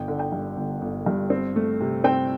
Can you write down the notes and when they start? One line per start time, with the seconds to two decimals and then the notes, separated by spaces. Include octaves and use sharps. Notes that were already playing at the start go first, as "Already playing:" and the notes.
Already playing: G1 G5
0.08 D3
0.19 G5
0.32 G2
0.57 G1
0.82 G1
1.06 G2
1.30 C4
1.56 A3
1.81 C3
2.04 C4 G5